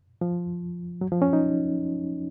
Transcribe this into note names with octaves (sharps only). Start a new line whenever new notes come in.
F3
F#3
F3
C#4
D#4